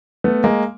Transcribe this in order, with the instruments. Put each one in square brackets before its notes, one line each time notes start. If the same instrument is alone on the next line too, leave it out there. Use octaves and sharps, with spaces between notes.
[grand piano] A3 B3
G#3 A#3